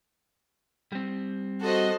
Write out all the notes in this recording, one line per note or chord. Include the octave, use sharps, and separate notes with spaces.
G3 C4
F#4 A4 C5 D#5